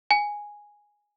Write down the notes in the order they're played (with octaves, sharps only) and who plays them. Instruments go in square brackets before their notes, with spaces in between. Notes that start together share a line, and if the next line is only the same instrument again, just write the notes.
[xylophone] G#5